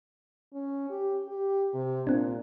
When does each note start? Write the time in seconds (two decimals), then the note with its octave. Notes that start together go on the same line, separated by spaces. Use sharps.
0.54 C#4
0.90 G4
1.28 G4
1.74 C3
2.07 A#2 C4 D4